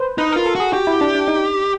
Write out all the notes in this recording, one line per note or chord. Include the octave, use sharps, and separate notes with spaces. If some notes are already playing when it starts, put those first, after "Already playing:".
Already playing: B4 C5
D#4 B4
F4 A#4
A4
F#4 G#4
F#4 G4
E4
D4
D4
D#4